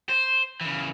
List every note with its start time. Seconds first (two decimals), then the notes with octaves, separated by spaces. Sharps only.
0.09 C5
0.61 C#3 E3